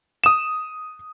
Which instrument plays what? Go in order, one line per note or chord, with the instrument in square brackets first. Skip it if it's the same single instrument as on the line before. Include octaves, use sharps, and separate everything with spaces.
[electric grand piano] D#6 E7